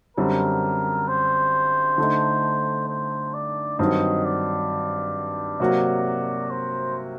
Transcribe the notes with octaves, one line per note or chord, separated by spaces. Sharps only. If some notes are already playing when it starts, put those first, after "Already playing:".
F#2 D3 G3 C4 A#4
C5
D3 A3 D#4
C5
D5
G2 D#3 F#3 C4 D#5
D5
C3 F#3 A#3 F#4
C5